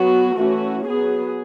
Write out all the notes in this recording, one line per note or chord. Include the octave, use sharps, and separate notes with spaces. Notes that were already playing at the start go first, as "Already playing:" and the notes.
Already playing: F#3 B3 F#4
E3 A3 C#4 F#4
F#3 B3 G#4